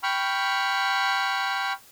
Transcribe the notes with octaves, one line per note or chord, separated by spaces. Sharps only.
G5 B5 C#6 F6